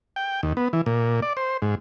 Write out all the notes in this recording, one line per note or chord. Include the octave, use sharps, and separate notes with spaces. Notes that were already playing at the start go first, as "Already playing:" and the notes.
G5
D#2
B3
E3
A#2
D5
C5
G#2